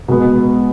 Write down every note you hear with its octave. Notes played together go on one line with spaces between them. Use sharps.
B2 G#3 B3